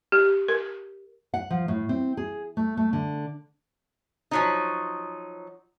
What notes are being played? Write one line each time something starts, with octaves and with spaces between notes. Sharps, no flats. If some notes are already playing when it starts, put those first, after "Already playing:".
G4
A#4
F#5
F3
A2
C4
G#4
A3
A3
D3
F3 F#3 D#4